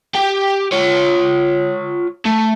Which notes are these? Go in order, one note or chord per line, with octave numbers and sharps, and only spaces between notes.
G4 G5
F4 C#5
A3